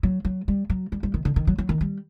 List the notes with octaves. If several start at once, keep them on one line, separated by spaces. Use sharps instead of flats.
F#3
F#3
G3
F#3
G3
G3
D#3
D3
D#3
F#3
F#3
D#3
G3